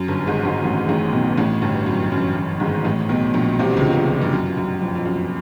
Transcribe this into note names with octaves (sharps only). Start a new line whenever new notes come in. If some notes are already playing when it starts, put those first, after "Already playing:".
Already playing: F#2
G1 G2
G#1 G#2
G#1 G#2
A1 A2
A1 A2
B1 B2
A1 A2
G1 G2
F#2
F#2
F#2
G#1 G#2
A1 A2
B1 B2
A#1 A#2
C2 C3
D3
C#2 C#3
C#2 C#3
G2
F#2
F#2
F2
F2
F#2